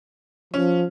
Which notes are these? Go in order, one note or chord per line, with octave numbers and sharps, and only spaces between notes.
F3 C#4